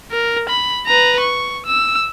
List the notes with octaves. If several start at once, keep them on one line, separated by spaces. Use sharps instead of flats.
A#4
B5
B4 A#5
C#6
E6